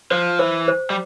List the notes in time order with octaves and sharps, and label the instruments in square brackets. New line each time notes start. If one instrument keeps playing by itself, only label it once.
[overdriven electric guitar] F3 [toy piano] C5
[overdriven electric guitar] E3 [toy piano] C5
[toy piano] C5
[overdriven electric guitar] G3